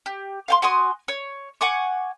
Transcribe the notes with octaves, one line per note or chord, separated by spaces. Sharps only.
G4
F5 G5 C6
F#4 G#5 C6 D#6
C#5
F#5 G#5 C#6 D6